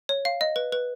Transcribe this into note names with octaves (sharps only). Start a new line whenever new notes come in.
C#5
F5
D#5
B4
B4